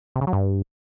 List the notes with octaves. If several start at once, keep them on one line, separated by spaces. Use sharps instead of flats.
C3
C#3
F#3
G2